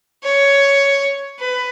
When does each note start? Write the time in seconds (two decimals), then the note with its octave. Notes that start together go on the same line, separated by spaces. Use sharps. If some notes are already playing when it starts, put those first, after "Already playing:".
0.24 C#5
1.39 B4